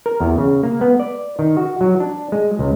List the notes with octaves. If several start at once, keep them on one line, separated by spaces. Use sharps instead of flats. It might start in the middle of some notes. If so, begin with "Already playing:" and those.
A#4
E2
C#3
A#3
B3
D5
D#3
F#4
F#3
D4
G#3
C#2